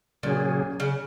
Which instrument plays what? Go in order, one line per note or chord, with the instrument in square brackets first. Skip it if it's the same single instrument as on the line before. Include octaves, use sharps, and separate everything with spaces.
[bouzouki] A#2 [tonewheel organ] C#3 F#3 C#4 G#4
[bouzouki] C#3